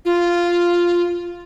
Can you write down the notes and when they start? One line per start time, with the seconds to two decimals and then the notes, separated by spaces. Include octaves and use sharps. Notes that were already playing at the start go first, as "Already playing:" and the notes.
0.05 F4